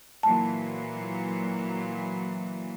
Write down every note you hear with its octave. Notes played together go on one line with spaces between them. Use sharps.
A#2 E3 F#3 A5